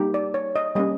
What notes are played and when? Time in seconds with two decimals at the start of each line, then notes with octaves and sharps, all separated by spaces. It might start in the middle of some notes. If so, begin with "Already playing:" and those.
Already playing: G3 A#3 D#4 G4
0.14 D5
0.34 C#5
0.56 D#5
0.75 G3 A#3 C#4 D#5